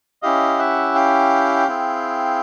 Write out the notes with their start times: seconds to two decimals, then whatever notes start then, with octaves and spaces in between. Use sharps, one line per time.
0.23 C#4 E4 G4 D#5 F5
0.59 E5 F#5
0.95 F5 G5
1.68 C4 E4 G#4